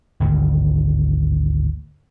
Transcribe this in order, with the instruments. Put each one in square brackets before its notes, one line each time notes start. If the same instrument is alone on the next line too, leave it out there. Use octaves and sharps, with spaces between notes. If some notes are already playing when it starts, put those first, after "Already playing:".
[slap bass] G#1 D2 G2